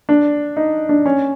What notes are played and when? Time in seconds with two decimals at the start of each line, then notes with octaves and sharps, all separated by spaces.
0.09 D4
0.57 D#4
0.89 D4
1.06 C#4